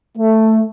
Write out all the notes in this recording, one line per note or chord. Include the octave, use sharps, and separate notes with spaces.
A3